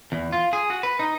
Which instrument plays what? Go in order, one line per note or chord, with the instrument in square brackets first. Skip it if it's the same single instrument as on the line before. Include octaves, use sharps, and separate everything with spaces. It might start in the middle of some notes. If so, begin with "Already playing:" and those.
[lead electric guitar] E2
F4
G#4
F#4
B4
D#4